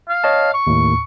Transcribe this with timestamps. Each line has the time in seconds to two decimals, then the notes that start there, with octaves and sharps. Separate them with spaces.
0.09 F5
0.24 C#5 D#5 A5
0.54 C#6
0.67 D#2 A2